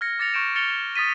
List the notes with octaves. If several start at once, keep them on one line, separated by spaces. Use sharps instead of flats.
F6 G#6 A#6 C#7
D6 A6 A#6 C#7 F7
C#6 F6 G6 D7 E7
F6 A6 C#7 F7 G7
E7
D#6 A6 B6 D#7